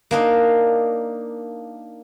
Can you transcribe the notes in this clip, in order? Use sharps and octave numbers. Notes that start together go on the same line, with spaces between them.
A#3 D4 D#4